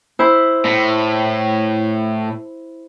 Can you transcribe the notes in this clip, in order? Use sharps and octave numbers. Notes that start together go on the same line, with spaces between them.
E4 C5
A2